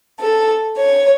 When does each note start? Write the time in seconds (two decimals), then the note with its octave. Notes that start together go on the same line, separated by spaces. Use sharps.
0.19 A4
0.77 C#5